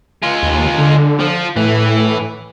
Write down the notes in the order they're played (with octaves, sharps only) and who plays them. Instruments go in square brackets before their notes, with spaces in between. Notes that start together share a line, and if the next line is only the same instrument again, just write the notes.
[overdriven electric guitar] G#3 F4
[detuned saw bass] D#2
D3
[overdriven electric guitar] F3
[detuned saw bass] A2 [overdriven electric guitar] E3